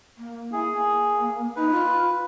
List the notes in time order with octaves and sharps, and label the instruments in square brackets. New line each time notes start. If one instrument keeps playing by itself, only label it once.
[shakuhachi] A#3
[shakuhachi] E4 [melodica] G#4
[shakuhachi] A#3
[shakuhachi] D#4 [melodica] B4
[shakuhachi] F4